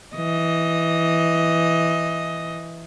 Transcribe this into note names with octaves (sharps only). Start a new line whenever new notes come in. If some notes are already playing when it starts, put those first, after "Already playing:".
E3 D#5